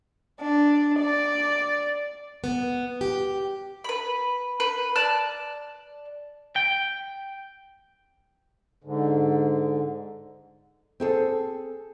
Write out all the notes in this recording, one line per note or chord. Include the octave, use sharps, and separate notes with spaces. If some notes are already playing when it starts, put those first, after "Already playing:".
D4
D5
B3
G4
B4 B5
B4
D5 A5 F#6
G5
G#2 D3
C4 G#4 A4